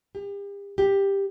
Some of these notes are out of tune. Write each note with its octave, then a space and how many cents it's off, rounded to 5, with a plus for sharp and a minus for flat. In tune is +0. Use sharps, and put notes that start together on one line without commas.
G4 +40
G4 +10